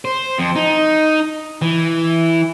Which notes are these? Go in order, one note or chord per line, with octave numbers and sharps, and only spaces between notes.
C5
F2
D#4
E3